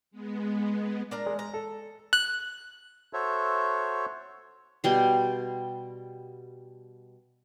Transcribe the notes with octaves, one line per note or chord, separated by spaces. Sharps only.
G#3 B3
D4 A#4 A#5
G#3
A#5
A4
F#6
F#4 A4 C5 C#5 E5
B2 G3 C6